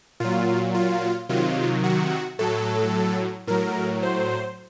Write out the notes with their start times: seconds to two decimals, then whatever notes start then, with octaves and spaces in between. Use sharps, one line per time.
0.20 A#2 F#3 F4
0.74 F4
1.29 C3 D#3 F#3 F4
1.84 F#4
2.39 A2 F#3 A4
3.47 A2 F#3 A#4
4.03 C5